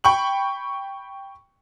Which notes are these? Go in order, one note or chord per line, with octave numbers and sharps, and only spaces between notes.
G5 B5 C#6 F#7